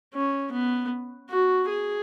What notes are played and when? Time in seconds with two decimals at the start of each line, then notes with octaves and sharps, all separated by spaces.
0.14 C#4
0.52 B3
1.30 F#4
1.69 G#4